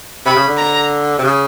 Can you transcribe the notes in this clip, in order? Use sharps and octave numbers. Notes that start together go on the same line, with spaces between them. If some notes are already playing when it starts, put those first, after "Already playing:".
C3 B5
C#3
D3
A#5
C3
C#3